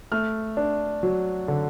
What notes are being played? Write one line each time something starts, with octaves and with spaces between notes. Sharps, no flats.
A3 F6
D4
F#3
D3